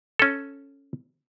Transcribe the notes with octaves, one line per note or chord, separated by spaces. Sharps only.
C#4 A4